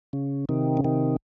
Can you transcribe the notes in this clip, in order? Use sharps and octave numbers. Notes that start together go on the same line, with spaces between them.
C#3
C3 D#3
C#3
C3 D#3